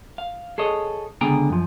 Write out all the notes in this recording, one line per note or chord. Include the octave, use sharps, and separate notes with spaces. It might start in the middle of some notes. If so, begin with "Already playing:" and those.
F5
G#4 A4 C#5 D#5
C#2 D3 B3 G#4 G5 A#5
F#2 F3